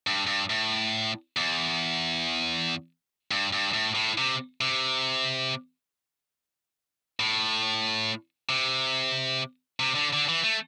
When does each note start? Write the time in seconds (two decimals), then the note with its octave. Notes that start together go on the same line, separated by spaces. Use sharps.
0.07 G2
0.27 G2
0.50 A2
1.37 E2
3.31 G2
3.53 G2
3.74 A2
3.95 A2
4.18 C3
4.61 C3
7.20 A2
8.49 C3
9.80 C3
9.95 D3
10.13 D3
10.29 E3
10.44 A3